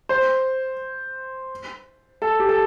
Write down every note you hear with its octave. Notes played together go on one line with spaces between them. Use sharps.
C5
A4
G4
A4